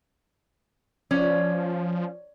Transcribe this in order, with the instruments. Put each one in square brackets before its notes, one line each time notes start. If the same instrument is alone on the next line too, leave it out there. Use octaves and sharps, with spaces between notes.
[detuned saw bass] F3 [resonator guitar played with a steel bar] C#4 [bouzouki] D5